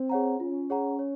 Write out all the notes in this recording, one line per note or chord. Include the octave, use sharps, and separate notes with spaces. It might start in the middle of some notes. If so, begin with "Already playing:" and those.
Already playing: C4
G#4 C#5 F#5 A#5
C#4 F4
G#4 C#5 F#5 A#5
C#5